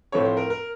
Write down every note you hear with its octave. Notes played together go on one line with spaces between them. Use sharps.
A2 F3 A3 C4 C#5
C5
A#4
A#4